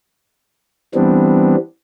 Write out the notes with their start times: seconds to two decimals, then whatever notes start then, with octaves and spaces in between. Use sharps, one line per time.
0.95 E3 G3 B3 C4 D4